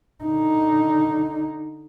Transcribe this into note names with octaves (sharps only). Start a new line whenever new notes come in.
D3 D#4